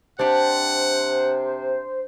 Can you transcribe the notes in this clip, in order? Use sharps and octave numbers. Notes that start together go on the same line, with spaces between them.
C3 D4 G4 C5 F#5